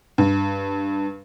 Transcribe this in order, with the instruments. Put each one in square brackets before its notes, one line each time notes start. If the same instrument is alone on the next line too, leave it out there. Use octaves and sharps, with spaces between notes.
[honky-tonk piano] G2